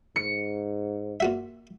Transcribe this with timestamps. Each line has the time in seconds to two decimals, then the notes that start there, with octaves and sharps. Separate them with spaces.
0.16 G#2 C#7
1.20 A#2 F#4 E5